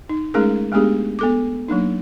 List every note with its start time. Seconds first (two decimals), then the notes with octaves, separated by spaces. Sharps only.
0.09 D#4
0.34 G#3 A3 C#4 D#4 G#4 A#4
0.72 G#3 A3 B3 D4 G4 G#4
1.19 B3 A4 D6
1.68 F#3 A#3 D4 D#4